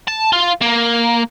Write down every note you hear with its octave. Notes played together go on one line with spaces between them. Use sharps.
A5
F4
A#3